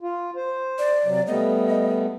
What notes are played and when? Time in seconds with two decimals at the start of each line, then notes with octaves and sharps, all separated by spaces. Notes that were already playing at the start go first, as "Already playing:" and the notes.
0.01 F4
0.36 C5
0.78 D5
1.05 C3 F#3
1.27 G3 A3 B3 D#5